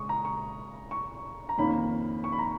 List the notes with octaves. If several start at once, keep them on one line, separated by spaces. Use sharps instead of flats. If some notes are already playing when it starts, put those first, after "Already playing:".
Already playing: C#3 G#3 C#6 D#6
A#5
C#6
C#6
A#5
F2 D#3 A#3 C#4 B5
C#6
B5
A#5